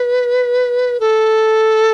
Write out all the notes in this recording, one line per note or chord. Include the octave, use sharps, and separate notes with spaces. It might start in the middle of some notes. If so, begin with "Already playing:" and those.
Already playing: B4
A4